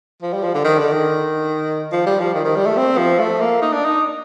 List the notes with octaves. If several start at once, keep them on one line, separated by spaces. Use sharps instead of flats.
F3
G3
F3
D3
D#3
D3
D#3
F3
G3
F3
D#3
D#3
G3
A3
C4
F3
A3
A#3
D#4
D4
D#4